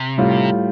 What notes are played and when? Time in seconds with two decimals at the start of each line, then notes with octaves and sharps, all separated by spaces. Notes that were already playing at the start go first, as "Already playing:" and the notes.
Already playing: C3
0.18 A2 G3 F4